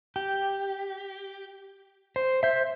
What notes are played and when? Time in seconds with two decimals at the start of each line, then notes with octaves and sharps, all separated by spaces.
0.16 G4
2.16 C5
2.43 C5 E5